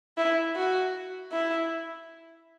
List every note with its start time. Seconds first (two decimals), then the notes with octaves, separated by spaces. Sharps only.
0.18 E4
0.56 F#4
1.32 E4